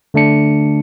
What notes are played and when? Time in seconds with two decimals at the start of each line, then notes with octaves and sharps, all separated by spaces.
0.14 D3 A3 D4 C#7